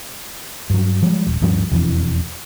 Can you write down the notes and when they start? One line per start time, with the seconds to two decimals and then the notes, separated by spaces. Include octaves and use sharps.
0.70 G2 F#3
1.02 F3 G3 G#3
1.26 D#1
1.41 D1 G2 F3 G3
1.71 E1 F2 E3